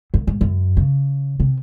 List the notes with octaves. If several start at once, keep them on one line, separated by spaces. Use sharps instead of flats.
F#2
G#2
F#2
C#3
C3